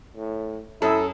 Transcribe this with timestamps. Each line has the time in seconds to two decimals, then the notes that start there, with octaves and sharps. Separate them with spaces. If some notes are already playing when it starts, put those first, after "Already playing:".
0.16 A2
0.82 F#2 E4 A4 D#6 E6